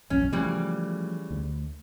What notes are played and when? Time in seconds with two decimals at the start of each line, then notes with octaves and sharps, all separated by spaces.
0.10 E1 A#1 F#2 C#4
0.33 C#3 E3 F3 G3 A3
1.31 D2